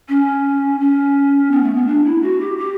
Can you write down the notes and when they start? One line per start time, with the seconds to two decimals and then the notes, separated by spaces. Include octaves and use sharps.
0.09 C#4
0.80 C#4
1.51 B3
1.63 A3
1.75 B3
1.87 D4
2.04 E4
2.22 F#4
2.40 G4
2.58 G4